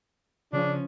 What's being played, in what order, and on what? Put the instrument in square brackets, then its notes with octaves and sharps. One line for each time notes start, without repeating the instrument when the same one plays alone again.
[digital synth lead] C#3 [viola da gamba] F3 C#4 [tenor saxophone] D4